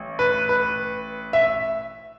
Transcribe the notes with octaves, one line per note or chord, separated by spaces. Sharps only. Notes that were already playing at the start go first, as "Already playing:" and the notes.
Already playing: A1
B4
B4
E5